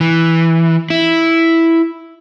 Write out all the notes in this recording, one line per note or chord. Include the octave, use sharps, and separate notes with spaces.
E3
E4